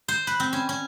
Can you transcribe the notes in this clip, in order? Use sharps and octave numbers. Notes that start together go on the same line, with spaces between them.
C5
B4
C4
C#4
C#4